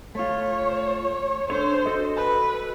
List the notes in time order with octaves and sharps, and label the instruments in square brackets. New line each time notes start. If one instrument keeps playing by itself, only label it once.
[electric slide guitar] A3 F4 [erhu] C#5
[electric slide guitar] D4 A4 C#5 [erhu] C5
[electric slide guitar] F#4 A4 D#5
[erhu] B4